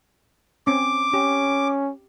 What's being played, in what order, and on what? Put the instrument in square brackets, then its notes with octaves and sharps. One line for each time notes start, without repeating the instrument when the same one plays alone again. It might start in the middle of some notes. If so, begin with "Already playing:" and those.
[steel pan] C4 C#4 [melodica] D6
[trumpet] C#4 [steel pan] G4